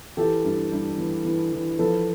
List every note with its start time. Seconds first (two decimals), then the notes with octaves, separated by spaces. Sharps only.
0.17 E3 G4 A4
0.45 G2
0.72 G2
0.98 E3
1.25 E3
1.52 E3
1.79 F3 A4 B4